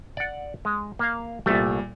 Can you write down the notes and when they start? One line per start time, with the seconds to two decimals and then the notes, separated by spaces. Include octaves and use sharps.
0.17 D5 F#5
0.65 G#3
0.99 A#3 F5
1.46 C2 A#2 G3 A3